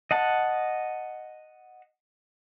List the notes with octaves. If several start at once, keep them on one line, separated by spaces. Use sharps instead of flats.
D#5 F#5 A5